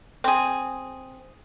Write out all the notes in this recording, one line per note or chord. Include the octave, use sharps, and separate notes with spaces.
C4 G#4